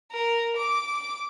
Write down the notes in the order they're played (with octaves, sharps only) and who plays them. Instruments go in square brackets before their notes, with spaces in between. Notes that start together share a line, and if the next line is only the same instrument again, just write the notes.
[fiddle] A#4
D6